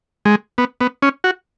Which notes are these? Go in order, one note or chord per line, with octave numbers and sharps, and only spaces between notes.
G#3
B3
B3
C#4
F#4